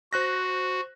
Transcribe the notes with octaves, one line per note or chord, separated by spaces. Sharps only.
F#4 C5 F#6 A#6